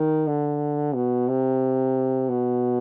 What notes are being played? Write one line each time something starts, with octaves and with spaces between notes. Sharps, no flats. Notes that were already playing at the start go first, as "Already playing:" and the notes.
Already playing: D#3
D3
B2
C3
B2